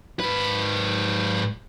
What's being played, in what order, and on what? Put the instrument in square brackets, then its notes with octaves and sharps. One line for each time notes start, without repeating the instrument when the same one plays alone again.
[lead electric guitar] G#2 B4